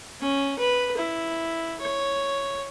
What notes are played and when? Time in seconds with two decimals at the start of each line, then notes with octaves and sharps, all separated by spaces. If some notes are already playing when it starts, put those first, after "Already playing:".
0.21 C#4
0.59 B4
0.98 E4
1.81 C#5